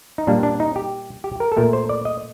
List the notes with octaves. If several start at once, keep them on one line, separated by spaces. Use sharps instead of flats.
D#4
A#2 G3 A#3 D4
D4
D#4
G4
G4
A#4
A4
A#2 A3 A#4
C5
D5
D#5